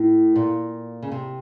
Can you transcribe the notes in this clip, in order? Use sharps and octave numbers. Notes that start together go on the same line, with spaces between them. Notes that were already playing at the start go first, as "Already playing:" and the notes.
Already playing: A2
A#2
C#3
C3